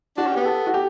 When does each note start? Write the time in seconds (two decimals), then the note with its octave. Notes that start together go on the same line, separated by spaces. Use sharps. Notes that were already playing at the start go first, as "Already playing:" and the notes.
0.17 D4 F#4
0.27 C#4
0.32 B3 G4
0.46 A4
0.67 F#4
0.74 G4